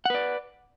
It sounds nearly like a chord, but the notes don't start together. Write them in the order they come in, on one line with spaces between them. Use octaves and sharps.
F#5 B4 D5